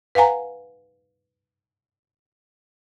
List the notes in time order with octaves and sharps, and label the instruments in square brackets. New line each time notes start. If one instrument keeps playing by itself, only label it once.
[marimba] B4 F5 F#5 G#5 A#5